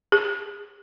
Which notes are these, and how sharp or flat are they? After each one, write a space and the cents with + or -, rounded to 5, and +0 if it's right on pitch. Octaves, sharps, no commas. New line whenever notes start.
G#4 -40